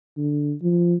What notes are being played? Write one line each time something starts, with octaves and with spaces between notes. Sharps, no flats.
D3
F3